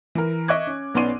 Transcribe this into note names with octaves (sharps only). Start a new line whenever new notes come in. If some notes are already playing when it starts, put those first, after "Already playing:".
E3 A#4
D#5 E5 C#6 D6 F#6 G#6
C#4
B1 B3 C#4 D5 C6 D#7